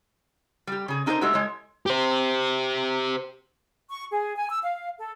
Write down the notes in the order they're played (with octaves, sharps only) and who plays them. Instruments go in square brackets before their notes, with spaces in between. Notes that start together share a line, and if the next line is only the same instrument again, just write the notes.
[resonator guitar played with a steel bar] G3 G4
C#3 G#4
D4 D#4 F4 G#4 A#4 C5
G#3 A3 E4 F#4 G4
G#3 C#5
[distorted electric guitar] G4 C5
[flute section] C#6
G#4
G#5
E6
F5
A4